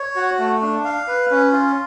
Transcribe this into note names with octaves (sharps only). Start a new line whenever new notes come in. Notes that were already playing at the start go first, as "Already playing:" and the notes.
Already playing: C#5
F#4
A3
D4
F5
B4
C#4
F4